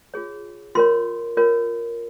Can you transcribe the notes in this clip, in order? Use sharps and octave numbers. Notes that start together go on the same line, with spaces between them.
F4 G#4 C#5
F4 A#4 C#5 C6
F4 A#4 C#5